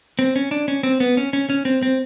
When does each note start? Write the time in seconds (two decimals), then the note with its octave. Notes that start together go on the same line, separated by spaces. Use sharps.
0.19 C4
0.36 C#4
0.51 D4
0.68 C#4
0.83 C4
1.00 B3
1.17 C#4
1.33 C#4
1.50 C#4
1.65 C4
1.83 C4